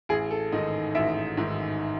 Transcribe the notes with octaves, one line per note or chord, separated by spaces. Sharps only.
A1 G#4
A4
G#2 D#3 D#5
A1 E5
G#2 D#3